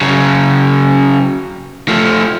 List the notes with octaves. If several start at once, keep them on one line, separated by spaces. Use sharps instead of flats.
C#3 F#3
F3 A3